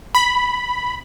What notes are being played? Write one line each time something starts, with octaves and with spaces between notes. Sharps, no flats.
B5